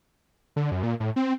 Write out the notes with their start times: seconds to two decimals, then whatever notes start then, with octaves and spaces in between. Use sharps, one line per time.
0.56 D3
0.71 F#2
0.83 A#2
1.00 A2
1.16 C4